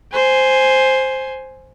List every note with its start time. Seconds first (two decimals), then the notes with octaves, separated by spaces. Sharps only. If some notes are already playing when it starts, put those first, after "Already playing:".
0.13 C5 G#5